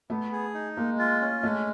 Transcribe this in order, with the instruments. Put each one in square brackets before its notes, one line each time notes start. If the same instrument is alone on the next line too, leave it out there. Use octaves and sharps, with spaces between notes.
[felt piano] A3 [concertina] B3
[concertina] G#4
D#4
[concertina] G#3 [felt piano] A#3
[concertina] F4
C#4
[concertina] G#3 [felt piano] A3